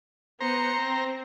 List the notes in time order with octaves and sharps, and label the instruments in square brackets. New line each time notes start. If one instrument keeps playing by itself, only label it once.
[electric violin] B3 C#7 [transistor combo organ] C5 A#5
[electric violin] C4